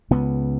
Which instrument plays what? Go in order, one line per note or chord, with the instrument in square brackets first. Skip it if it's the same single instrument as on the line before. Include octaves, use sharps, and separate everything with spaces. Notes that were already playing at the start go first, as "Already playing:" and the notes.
[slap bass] C#2 C#3 B3